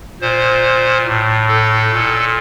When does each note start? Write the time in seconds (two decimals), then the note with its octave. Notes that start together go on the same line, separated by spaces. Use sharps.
0.21 A#2 C5
1.06 A2
1.48 A4
1.92 A#2